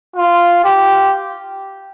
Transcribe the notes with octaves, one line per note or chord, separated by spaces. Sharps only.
F4
G4